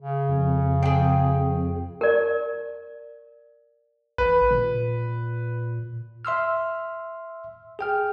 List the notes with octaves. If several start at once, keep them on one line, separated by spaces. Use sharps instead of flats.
C#3
F2
G#4 G5
A#4 D5
A1 B4
A#2
E5 C6 E6 F6
G#4 G5 F6